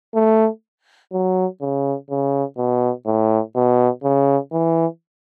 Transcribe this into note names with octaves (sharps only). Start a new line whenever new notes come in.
A3
F#3
C#3
C#3
B2
A2
B2
C#3
E3